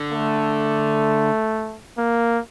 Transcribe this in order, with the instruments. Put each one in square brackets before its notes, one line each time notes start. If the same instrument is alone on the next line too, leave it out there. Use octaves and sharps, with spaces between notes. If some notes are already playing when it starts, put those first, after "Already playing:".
Already playing: [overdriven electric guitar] D3
[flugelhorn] A3
A#3